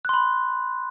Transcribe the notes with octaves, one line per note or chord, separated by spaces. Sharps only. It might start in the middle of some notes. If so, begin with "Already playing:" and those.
B5 C6 F#6